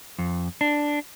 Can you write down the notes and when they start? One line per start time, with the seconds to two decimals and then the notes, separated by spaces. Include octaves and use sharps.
0.19 F2
0.61 D4